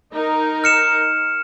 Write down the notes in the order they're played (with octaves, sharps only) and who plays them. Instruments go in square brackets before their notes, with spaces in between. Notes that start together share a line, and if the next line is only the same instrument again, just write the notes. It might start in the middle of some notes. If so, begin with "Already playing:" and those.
[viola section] D#4 A#4
[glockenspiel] F6 C#7 E7